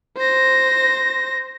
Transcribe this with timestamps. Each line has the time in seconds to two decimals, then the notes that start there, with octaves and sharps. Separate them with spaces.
0.17 C5 A#6